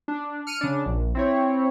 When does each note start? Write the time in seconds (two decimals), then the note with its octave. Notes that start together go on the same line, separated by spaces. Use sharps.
0.08 D4
0.47 F6 C#7 D#7
0.61 C#3 D4
0.86 A#1
1.15 C4 E4 C#5